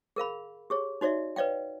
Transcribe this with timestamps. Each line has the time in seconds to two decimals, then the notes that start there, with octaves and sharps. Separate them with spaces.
0.16 G#4 A#4 F5 B5
0.70 G4 G#4 C#5
1.01 D#4 F#4 C#5 D5 E5
1.36 B4 C#5 D5 F5 G5